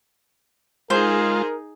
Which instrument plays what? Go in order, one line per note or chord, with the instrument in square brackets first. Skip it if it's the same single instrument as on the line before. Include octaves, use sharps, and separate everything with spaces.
[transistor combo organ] G#3 F4 [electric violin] D#4 G#4 [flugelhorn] A#4 [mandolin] C5